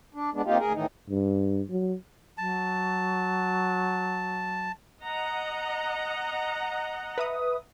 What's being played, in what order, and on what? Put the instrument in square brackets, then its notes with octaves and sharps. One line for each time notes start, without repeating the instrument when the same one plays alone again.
[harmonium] D4
G#3 B3 D4
C3 A#3 D#4 F4 G4
D2 G#4 A#4
A2 D#3 E3 D#4
[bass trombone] G2
F#3
[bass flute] F#3 [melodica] A5
[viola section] D#5 F#5 A#5
[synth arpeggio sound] B4 E5 D#6